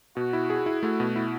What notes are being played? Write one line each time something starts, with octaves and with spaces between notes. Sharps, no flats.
B2 F#4
E4
G#4
E4
A3 F#4
B2
E4